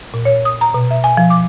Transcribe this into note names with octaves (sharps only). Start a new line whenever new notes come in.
A#2
C#5
D#6
A#5
B2
E5
G#5
F3
D6